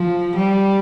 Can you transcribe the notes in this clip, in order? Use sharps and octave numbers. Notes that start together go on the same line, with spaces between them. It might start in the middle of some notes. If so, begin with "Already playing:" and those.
Already playing: F3
G3